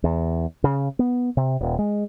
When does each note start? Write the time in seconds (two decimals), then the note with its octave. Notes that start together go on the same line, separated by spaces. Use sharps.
0.04 E2
0.64 C#3
0.99 B3
1.37 C3
1.61 D#1
1.79 G#3